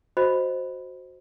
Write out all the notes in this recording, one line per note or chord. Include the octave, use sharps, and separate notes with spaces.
F#4 C5 D#5 B5